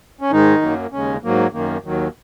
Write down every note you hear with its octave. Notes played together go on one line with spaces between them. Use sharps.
C#4
G#2 D#3 G#3 D#4
F#2 F#3 A#3
D#2 C#3 G#3 C#4
G#2 F#3 A#3
F#2 D#3 A#3
D#2 D#3 F#3